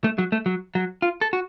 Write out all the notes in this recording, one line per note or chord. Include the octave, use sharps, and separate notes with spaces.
A3
F#3
A3
F#3
F#3
F4
A4
F#4